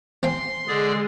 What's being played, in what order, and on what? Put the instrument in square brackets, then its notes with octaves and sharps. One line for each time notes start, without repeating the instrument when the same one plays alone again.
[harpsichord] C4 G5 G#5 [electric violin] C6
[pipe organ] D3 G#4 D5 [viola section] G#3